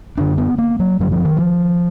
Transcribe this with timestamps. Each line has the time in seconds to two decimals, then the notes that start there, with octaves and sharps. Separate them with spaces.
0.17 F#2 D3 D4
0.38 B3
0.58 A#3
0.80 F#3
1.00 F#2 D3 F#3
1.12 F3
1.25 D#3
1.37 F3